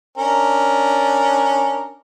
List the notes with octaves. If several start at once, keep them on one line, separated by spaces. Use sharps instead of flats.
C#4 D4 A#4